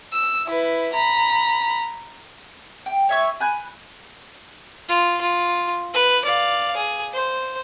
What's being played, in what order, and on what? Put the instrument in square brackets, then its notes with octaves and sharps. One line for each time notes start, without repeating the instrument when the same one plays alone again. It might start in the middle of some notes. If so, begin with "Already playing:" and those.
[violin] E6
E4 B4
A#5 B5
[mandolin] G5
C#5 E5 C#6
G#5 B5 F#6 G6
[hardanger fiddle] F4
F4
B4
D5 F5
G#4
C5